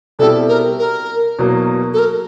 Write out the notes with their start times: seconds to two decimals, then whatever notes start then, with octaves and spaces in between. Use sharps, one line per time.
0.19 B2 G3 C4 E4 G4 A4
0.49 A#4
0.79 A#4
1.39 E2 B2 F#3 A#3
1.94 A4
1.99 A#4